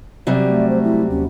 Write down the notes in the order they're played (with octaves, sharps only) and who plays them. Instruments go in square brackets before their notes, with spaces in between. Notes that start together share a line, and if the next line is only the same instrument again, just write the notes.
[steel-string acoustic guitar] C3 F#3 G3 [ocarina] D5
[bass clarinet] A3
[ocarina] C5
E4
[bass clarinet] D#2 [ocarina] C#4